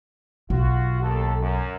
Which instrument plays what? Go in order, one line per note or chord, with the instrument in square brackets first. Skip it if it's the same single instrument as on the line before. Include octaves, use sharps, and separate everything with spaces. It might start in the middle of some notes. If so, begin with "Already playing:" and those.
[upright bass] B1 [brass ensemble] F4 F#4
[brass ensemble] D#2 A4
F#2